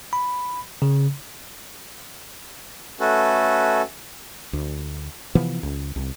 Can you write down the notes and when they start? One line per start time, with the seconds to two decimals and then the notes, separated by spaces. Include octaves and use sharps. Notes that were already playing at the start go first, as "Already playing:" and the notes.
0.13 B5
0.82 C#3
3.00 A3 C#4 F#4 A4 B4
4.53 D2
5.35 C3 E3 F3 B3
5.63 C#2
5.96 C2